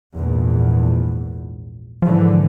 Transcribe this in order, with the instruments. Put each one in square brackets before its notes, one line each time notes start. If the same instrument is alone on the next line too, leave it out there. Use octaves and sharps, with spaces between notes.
[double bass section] A#1 E2 G#2
[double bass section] G#2 D3 E3 [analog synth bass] F3